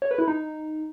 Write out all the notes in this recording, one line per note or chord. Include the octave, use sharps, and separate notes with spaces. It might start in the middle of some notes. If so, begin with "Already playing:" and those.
C#5
B4
E4
D#4